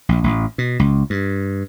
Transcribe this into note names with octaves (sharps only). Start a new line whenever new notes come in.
A#1
A1
B2
C#2
G2